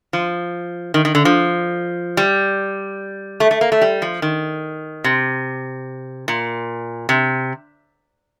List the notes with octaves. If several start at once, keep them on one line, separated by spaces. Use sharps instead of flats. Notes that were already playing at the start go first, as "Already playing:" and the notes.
F3
D#3
D#3
D3
F3
G3
A3
A3
A#3
A3
G3
F3
D#3
C3
A#2
C3